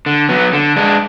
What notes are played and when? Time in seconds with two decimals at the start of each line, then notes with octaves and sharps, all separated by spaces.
0.06 D3
0.29 F#3 B3
0.53 D3
0.76 G#3 D4